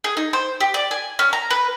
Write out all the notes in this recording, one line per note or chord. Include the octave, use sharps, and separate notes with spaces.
G#4
D#4
C5
G4
D5
G#5
C#4
A#5
B4